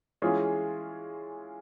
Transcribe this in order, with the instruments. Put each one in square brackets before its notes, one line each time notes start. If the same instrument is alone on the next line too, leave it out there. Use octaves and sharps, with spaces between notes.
[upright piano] E3 G#3 C#4 F4 G#4